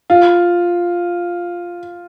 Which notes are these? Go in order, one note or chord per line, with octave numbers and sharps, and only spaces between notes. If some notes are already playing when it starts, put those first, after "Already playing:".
F4